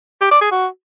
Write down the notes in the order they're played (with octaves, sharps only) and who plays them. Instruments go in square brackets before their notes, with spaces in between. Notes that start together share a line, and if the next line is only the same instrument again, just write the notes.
[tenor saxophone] G4
D5
G#4
F#4